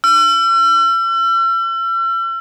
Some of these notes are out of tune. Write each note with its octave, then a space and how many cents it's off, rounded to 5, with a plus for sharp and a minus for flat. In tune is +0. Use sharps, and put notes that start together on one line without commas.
E6 +45